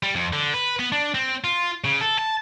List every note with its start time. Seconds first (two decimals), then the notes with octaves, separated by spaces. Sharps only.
0.03 G3
0.15 F2
0.33 D3
0.54 B4
0.79 B3
0.92 D4
1.14 C4
1.44 F4
1.84 C#3
2.01 A4
2.19 A5